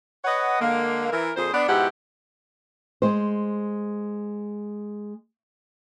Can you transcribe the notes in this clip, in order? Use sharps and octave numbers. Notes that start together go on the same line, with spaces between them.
B4 C#5 D#5 F#5
D3 G#3 A#3
E3 A#4
F2 A#2 G#4 C5
B3 D4
G#2 B2 E4 G4 F#5
G#3 C5